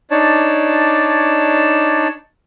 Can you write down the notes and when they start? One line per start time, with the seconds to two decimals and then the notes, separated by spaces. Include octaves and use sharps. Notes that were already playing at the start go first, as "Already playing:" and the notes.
0.11 D4 D#4 C#5 D5 A5